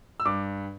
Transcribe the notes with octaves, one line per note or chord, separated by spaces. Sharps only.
E6
G2 D6